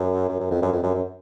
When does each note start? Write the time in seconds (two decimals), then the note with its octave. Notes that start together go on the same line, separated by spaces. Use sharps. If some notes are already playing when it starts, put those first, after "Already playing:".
Already playing: F#2
0.29 F#2
0.40 F#2
0.51 F2
0.62 F#2
0.72 F2
0.83 F#2
0.95 F#2